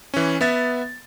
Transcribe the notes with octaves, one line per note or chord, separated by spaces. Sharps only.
E3 C#4
B3 E5 A6